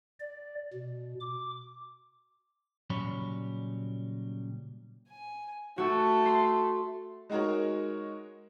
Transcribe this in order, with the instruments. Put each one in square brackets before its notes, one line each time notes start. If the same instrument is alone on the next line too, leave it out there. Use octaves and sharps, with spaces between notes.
[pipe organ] D5
B2
D6
[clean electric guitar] A#2 C#3 F#3 G3 C#5 B5
[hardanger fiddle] G#5
[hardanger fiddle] A3 [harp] F#4 A4
[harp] C6
[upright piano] G#3 D#4 F#4 A#4 C#5